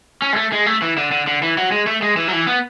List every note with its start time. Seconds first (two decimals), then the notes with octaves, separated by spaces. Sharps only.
0.22 C#4
0.33 G#3
0.36 A3
0.52 G#3
0.66 A3
0.82 E3
0.97 D3
1.12 D3
1.27 D3
1.43 E3
1.58 F#3
1.72 G#3
1.87 A3
2.02 G#3
2.17 E3
2.27 F#3
2.33 E3
2.47 B3